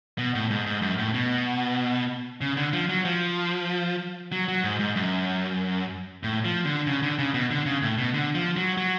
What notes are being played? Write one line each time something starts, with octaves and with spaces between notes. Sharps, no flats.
B2
A2
G#2
G#2
F#2
A2
B2
C#3
D3
F3
F#3
F3
F#3
F#3
G#2
G#2
F#2
A2
F3
D3
C#3
D3
C#3
B2
D3
C#3
A2
B2
D3
F3
F#3
F#3